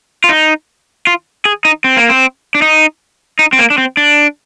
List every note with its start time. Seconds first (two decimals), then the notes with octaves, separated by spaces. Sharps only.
0.24 F4
0.29 D#4
1.07 F4
1.45 G#4
1.65 D#4
1.84 C4
1.97 A#3
2.09 C4
2.55 D4
2.62 D#4
3.39 D#4
3.53 C4
3.59 A#3
3.70 D4
3.78 C4
3.97 D4